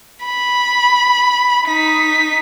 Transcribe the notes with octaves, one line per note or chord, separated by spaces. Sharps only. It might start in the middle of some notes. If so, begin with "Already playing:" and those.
B5
D#4 B6